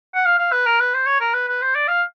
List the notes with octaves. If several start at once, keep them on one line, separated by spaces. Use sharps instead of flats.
F#5
F5
F5
B4
A#4
B4
C5
C#5
A#4
B4
B4
C5
D5
F5